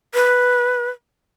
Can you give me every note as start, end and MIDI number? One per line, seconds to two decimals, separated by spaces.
0.14 0.89 71